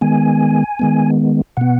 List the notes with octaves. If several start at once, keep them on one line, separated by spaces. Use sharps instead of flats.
D#3 G#3 B3 G#5
D#3 G#3 B3
B2 B3 F#5